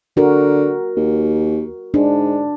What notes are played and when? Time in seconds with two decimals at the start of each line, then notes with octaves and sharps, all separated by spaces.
0.17 D3 F#4 A#4
0.97 D#2
1.94 G#2 D4